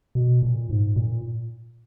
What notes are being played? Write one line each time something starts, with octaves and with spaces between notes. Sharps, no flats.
B2
A#2
G#2
A#2